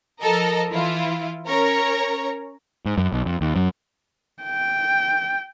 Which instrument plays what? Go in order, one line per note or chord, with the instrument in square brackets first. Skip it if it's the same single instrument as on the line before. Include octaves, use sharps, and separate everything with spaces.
[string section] F3 A4 A#4 D#5 A#5
E3 E4 F4
C#4 A#4 C#5 A#5
[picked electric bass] G#2
F#2
B1
F2
D#2
F#2
[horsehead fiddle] G5